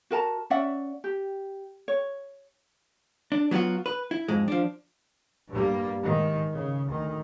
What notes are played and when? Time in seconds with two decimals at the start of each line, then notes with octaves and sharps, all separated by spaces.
0.11 F#4 A#4 A5 A#5
0.50 C#4 D5 E5 F#5
1.04 G4
1.88 C#5
3.32 D4
3.51 F#3 B3 C#4 F4 F#4
3.86 B4
4.11 E4
4.28 F2 G#2 G#3
4.48 F3 D4
5.49 G2 G3 A#3
6.02 G#2 D#3
6.53 C#3
6.86 D2 D#3